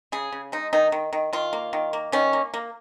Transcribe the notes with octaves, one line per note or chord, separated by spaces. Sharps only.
C#3 G#4
C#3
G#3 D#4
D#3 D#4
D#3
D#3
D#3 F4
A#3
D#3
A#3
D#3 C#4
A#3
A#3